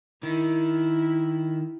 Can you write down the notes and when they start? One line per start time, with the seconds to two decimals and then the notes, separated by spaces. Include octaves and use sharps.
0.23 D#3 E4